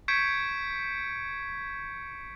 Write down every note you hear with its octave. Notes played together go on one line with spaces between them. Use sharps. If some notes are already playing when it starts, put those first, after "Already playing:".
C#6 G6 G#6 B6 C#7 D7